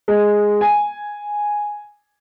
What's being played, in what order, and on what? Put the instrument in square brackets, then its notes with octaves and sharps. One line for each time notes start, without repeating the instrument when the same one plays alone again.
[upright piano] G#3
G#5